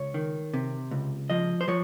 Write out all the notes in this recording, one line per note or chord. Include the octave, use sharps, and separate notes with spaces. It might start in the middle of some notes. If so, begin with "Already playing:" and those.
Already playing: C#2 C#5
D#3
C3
C#2
F3 D#5
C5
F3 C#5